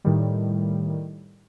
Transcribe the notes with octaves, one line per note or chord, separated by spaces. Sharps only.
A2 D#3 G3